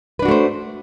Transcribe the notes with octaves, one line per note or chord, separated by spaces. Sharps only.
A3 D4 F#4 B4 C5